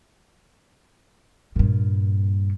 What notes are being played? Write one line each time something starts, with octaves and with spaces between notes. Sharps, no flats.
G2 A#2